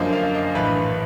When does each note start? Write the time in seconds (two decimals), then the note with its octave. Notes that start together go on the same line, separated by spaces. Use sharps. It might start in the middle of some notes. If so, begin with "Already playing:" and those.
Already playing: F#2 D3 F3 A#3 D#5
0.13 F5
0.35 D#5
0.55 A#1 A2 E3 B4